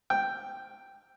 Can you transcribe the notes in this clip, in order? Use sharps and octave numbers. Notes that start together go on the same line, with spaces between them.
G5